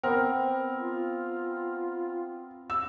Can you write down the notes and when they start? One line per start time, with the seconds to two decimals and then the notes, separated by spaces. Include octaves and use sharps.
0.03 B3 C4 A#4
0.78 F4
2.70 E6